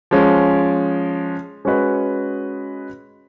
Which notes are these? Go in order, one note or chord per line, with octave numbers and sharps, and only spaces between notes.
F3 G#3 C#4
G#3 C#4 F#4 B4 D#5